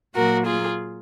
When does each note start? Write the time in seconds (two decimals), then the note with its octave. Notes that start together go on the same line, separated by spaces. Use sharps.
0.15 A#2 F#3 A#3 F#4 A#4
0.46 F4 G#4